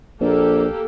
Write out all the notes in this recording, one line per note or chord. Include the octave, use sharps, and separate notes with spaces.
A#1 A#3 G4 A4